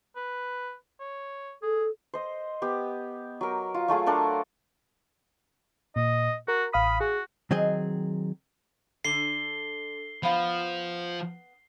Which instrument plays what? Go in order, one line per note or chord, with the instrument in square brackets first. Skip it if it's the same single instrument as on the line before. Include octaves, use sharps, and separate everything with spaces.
[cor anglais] B4
C#5
[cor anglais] G#4 [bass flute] A4
[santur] C5 D#5
B3 G4
F#3 A#4
F4
F#3 A3 F4 G#4
A3 D4 A4 A#4
[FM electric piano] A#2 [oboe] D#5
[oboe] F#4 [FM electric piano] A#4
[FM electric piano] A1 F5 D#6 [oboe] B5
[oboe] F#4 [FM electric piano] G#4
[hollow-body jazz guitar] D#3 F#3 C4 G#4 D#5
[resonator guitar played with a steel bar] D3 [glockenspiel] C7 G7
[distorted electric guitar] F3 [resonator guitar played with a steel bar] B3 F5